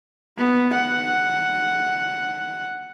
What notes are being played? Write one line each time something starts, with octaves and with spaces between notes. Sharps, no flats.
B3
F#5